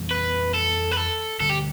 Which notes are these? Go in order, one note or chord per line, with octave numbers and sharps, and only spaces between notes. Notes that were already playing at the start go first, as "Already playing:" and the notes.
Already playing: F2 E3 G3 B3
B4
A4
B4
A4
D2 D3 G3 A4
G4